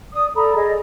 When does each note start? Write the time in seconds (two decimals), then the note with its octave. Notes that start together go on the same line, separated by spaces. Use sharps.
0.12 D5 D#6
0.35 A4 D5 A#5 B5
0.56 G#4 D5 D#5